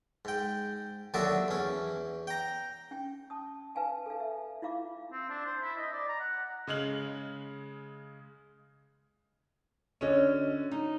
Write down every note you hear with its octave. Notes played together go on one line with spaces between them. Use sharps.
G#2 G5
D#2 D3 F#3 F#4 D5 E5
E2 C#4
G5 A#5
C#4 G5
A5 D#6
B4 F5 G#5 A5
A4 F5
E5
E4 F4 F5 D6
C4
D4
C5
E4
D#5
D5
A#5
F#5
C#3 G#3 F6 F#7
D3 C#4 F#4 C#5 D#5
D#4